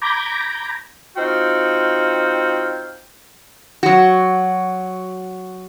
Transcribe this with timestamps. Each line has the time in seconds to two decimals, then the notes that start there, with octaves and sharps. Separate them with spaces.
0.02 A#5 B5 D6 G6 G#6 A#6
1.17 C4 D#4 F4 F#4 F5 G5
3.83 F#3 F#4